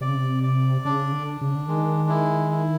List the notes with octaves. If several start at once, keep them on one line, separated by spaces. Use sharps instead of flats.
C3 D5
C#3
C3
D5
C#3 D4
D3
D4
C#3
D3
D#3 G#3
E4
E4